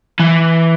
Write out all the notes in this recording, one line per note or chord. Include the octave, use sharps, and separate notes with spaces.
E3